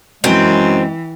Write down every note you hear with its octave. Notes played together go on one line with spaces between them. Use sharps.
F#2 E3 G#3 C4